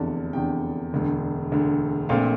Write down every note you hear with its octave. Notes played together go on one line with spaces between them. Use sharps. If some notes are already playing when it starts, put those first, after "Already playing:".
Already playing: F1 E2 D3 A5
F1 E2 D3 G5
E1 D2 D3
E1 D2 D3
A#1 A#2 A3 C4 F5